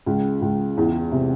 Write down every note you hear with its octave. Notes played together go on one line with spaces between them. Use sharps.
C#2
C#2
E2
C3